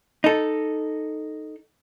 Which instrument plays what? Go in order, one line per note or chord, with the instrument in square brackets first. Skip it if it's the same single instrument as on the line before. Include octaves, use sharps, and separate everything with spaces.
[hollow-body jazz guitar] D#4 A4